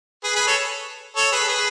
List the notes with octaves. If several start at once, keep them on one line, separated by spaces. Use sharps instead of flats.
G#4 B4
G#4 B4
A4 C#5
A4 C#5
G#4 B4
A4
G#4 B4